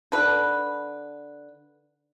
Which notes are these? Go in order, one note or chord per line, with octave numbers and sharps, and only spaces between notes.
D3 B4